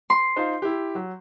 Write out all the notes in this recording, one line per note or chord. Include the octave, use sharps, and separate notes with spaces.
C6
D#4 F4 C5
E4 G4
F#3